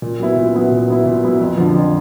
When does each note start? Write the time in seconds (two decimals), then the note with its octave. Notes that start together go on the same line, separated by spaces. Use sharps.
0.02 A#2
0.19 F#3 B3 E4
0.36 A#2
0.54 F#3 B3 E4
0.71 A#2
0.88 F#3 B3 E4
1.05 A#2
1.23 F#3 B3 E4
1.40 F2
1.57 D3 F3
1.75 F2